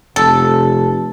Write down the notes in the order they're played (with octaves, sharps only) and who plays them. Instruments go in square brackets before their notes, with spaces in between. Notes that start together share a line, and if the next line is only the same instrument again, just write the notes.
[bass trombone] F1 [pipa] A4